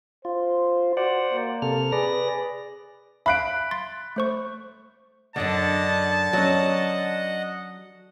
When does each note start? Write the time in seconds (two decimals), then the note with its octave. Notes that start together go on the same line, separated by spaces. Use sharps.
0.25 F4 C5
0.97 F#4 C5 D5 F#5
1.33 A#3
1.62 C3 A4 F6
1.92 G#4 B4 D5 A#6
3.26 E5 F5 B5 F#6 D7
3.71 C6 A6
4.16 A3 C5 C#6
5.36 C2 F#2 D3 D5 D#5 F#5 A5
6.33 F#3 C#4 D#5 F#5